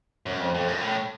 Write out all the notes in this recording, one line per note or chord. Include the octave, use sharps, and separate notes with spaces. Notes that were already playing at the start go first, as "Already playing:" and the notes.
F#2
F2
F2
F#2
A2